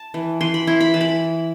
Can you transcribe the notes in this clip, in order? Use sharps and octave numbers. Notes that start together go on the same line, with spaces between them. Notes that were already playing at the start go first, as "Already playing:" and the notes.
Already playing: A5
E3
E3 C6
B5
E4 C6
B5
E3 A5
B5